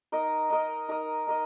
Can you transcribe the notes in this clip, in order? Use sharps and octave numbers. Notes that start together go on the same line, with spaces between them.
D#4 A#4 D#5
D#4 A#4 D#5
D#4 A#4 D#5
D#4 A#4 D#5